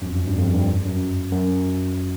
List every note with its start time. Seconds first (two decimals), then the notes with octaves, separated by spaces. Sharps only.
0.02 F#2
0.06 F2
0.16 F#2
0.27 G2
0.37 F2
0.53 G2
0.85 F#2
1.31 F#2